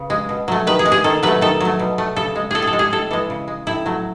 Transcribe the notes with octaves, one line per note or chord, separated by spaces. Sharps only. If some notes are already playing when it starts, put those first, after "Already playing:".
Already playing: C#3 B4
G#3
B2
F#3 A3
D#3 B4
G#4
G#3
G#4
D#3 A4
F#3 A3 B4
D#3 A4
F#3 A3
B2
A3
C#3 A4
G#3
A2 G#4 A4
G#4 A4
G#3
G#4
A2 A4
E3 G#3 A4
C#3
G#3
A2 E4
F#3 A3